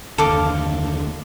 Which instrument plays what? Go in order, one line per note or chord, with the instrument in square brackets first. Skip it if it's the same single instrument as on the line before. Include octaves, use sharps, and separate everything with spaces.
[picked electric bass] F#1 D#2 D3 [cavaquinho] A4 F5 D6